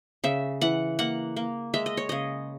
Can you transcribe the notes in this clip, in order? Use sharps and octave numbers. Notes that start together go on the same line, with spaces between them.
C#3 E5
E3 F#5
A#3 F#5
A#3
G#3 E5
D#5
C#5
C#3 D#5